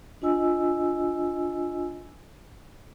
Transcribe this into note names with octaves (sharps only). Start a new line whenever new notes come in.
D4 F4 D#5 G#5 E6